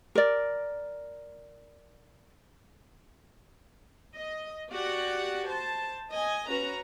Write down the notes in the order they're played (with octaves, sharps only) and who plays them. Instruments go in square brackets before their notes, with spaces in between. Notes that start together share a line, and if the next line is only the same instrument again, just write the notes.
[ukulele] A#4 D5
[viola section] D#5
F#4 G4 D5 F#5
C5 A5
D#5 G#5
C#4 F#4 B4 A#5